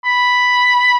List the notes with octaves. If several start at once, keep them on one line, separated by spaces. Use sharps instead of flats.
B5